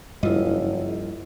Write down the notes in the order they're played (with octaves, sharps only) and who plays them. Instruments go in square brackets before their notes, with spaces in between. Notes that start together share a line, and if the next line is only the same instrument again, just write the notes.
[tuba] F#1 [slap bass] G2 F3 [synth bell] E4 F4 D#5